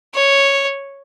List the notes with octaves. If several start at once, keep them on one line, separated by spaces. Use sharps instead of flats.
C#5